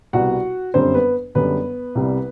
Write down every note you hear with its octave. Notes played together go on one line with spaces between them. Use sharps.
C2 B2 G3 B3 F#4 F#5
G1 F#2 D3 G3 C4 C5
B3 B4
F#2 D3 G3 B3 B4
C2 C3 G3